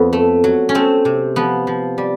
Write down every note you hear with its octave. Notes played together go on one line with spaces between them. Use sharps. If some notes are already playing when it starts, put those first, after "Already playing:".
Already playing: F2 B3
A3
F#3
C#4
A3 C4
C3
F3 B3
F3
G3